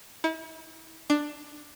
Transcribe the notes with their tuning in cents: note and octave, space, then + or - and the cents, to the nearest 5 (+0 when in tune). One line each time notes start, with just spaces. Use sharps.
E4 -40
D4 +10